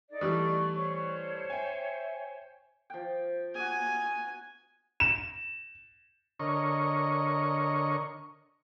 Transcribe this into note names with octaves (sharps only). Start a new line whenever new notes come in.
D#4 A4 D5
E3 G3 A3 C#6
C5 C#5
E5 G5 G#5
F3 G5
F#4 G#4 G#5
E7
D3 A#4 C#5 D#5 C#6